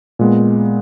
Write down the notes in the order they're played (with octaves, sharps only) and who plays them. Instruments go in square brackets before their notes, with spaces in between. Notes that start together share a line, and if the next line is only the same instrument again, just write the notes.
[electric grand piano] A#2 G#3 B3